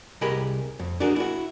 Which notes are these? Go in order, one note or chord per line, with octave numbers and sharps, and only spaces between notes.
C2 G4 G#4 A#4 D#5 B5
F2
D4 F#4 G#4 A#4
E4 F#4